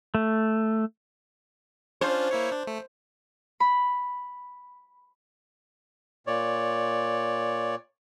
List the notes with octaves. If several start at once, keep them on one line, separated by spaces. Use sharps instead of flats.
A3
C#4 D4 F4 C5
A#3 E4 C#5
D4
A3
B5
A#2 C#5 D5